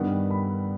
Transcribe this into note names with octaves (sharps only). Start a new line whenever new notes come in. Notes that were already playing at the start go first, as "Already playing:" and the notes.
Already playing: G2 D#3 G3 B3 F#5
B5